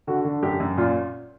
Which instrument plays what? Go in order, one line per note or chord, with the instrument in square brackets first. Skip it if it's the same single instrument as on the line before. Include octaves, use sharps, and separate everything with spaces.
[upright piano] D3 F#4
D3
F#2 G4
F#2
A#2 F4